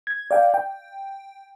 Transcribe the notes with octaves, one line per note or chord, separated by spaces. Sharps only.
G#6
D5 F5 G5
G5